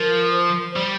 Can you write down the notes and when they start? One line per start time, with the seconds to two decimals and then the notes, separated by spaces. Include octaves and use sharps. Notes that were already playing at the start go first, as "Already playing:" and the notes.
Already playing: F3 A#4
0.31 C5
0.76 G3